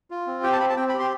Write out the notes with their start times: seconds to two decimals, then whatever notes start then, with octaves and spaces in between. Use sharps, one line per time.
0.11 F4
0.27 C4
0.43 G4 G5
0.52 A5
0.60 C4 B5
0.69 A5
0.77 C4 G5
0.89 B5
0.94 G4
0.99 C6